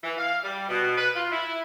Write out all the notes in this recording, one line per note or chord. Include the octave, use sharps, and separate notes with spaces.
E3
F5
G3
B2
B4
F4
E4